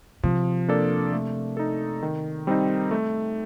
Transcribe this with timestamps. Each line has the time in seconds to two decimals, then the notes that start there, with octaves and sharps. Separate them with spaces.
0.23 C3 F3
0.68 A#3 D4 A4 D5
1.13 A3
1.57 D#4 A4
2.03 D#3
2.47 G3 C4 D#4
2.91 A3